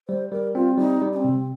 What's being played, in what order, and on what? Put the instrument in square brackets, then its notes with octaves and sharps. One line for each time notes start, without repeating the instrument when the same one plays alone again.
[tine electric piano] G3 [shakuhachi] C5
[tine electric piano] G3 [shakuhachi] A#4
[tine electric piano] C4 [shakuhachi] F4
[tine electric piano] G3 [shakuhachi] D#4
[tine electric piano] G3
[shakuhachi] D#4
C4
[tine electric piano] C3